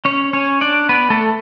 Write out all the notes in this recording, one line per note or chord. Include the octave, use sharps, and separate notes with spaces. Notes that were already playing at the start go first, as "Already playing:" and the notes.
C#4 C#5
C#4 C#5
D4 D5
B3 B4
A3 A4